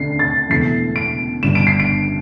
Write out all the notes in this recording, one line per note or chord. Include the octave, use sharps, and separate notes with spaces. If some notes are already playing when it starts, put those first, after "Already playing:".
Already playing: D2 C3 A3 D4 C7
A6
E1 E2 E3 A3 C7
D7
G1 G2 G3 D4 E7
D7
C7
D7